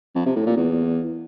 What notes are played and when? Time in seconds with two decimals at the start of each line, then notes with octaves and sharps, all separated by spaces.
0.15 F2
0.26 C3
0.36 A2
0.46 A#2
0.57 E2